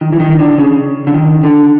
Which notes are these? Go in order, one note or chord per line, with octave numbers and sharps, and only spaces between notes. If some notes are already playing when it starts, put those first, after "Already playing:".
D#3
E3
D#3
D3
C#3
D3
D#3
D3